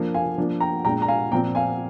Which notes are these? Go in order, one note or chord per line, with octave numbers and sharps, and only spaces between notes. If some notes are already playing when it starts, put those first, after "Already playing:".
Already playing: F3 A#3 D4
F5 G#5
F3 A#3 D4
G5 A#5
A#2 G#3 D4 G5 A#5
A#5
F5 G#5
A#2 F3 C4 G5 A#5
F5 G#5